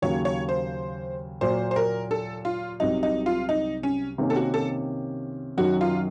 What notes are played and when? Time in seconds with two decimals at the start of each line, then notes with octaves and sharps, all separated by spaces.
0.02 D#2 C#3 F#3 A#3 C#5
0.25 C#5
0.49 C5
1.41 A#2 F#3 A#3 C5
1.71 C5
1.76 A#4
2.11 A4
2.45 F4
2.80 C2 C3 F#3 D#4
3.03 D#4
3.26 F4
3.49 D#4
3.83 C#4
4.18 C3 D#3 A#3 C#4
4.30 A4
4.36 F#4
4.54 A4
5.57 F#2 D#3 F#3 F#4
5.81 F4